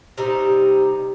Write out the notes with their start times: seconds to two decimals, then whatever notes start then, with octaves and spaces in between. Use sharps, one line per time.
0.18 C3 G3 D#4